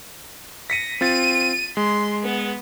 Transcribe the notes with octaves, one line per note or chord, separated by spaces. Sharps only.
A#6 B6 C#7 D#7
C4 F4 A6 D#7
G#3 C6
B3